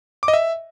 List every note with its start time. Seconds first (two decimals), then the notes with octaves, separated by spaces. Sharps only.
0.23 D6
0.28 D#5
0.33 E5